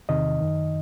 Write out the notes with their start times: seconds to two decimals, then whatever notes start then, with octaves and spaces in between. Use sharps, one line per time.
0.09 E2 C3 D#3 D#5
0.40 F#2 D#3